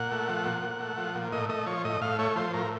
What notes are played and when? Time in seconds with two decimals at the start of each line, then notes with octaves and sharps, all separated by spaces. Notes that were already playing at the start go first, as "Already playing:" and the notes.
Already playing: A#2 F#5
0.12 A3
0.29 F3
0.46 A#2
0.62 A#2
0.80 A3
0.98 F3
1.15 A#2
1.32 A2 D#5
1.49 A3 D#5
1.66 F3 C#5
1.85 A2 D#5
2.01 A2 F5
2.19 A3 C#5
2.36 F3 C5
2.54 A2 A#4